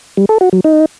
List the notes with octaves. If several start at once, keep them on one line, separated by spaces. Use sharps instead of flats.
G3
A4
F#4
F#3
D#4